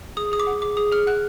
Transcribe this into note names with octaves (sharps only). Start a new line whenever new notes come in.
G#4 D#6
G#4 D#6
D6
F#5
G#4 D6
G#4 D#6
G#4 F6
F#5 F#6